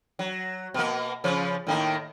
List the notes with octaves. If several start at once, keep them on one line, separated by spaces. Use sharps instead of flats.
F#3
B2 A#3
C#3 F3 C#4
A2 D#3 A#3